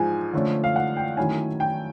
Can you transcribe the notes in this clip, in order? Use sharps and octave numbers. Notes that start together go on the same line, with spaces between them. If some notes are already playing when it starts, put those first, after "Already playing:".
Already playing: G#2 F3 G#3 G#5
D3 F3 A3 C#4
F5
F#5
G5
D#3 F#3 A3 C#4 E4 G#5
G5